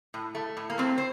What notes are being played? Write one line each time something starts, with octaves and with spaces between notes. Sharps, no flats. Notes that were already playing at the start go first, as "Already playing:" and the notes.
A2
A3
A2
A#3
A3 C4
C5